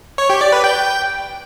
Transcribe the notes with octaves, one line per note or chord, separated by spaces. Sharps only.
C#5
G4
D5
B4
G5